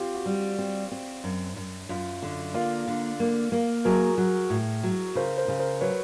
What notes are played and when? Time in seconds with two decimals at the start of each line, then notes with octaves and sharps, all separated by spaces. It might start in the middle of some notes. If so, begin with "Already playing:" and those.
Already playing: C4 F4 G4
0.15 F#4
0.26 G3
0.58 C4
0.91 C4
1.24 F#2
1.56 F#2
1.89 F#2 F4
2.23 D3
2.54 A#3 F4
2.88 D3
3.20 A#3
3.52 A#3
3.85 F#3 G#4 A#4
4.18 F#3
4.50 A2
4.83 F#3
5.15 C#3 A#4 C5
5.38 A#4 C5
5.48 C#3
5.59 A#4 C5
5.81 F#3 B4 C#5